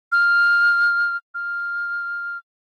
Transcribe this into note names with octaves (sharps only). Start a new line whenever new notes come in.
F6
F6